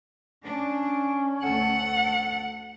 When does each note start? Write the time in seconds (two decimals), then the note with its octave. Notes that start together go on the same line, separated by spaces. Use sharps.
0.44 C#4 D4
1.42 D2 A4 F#5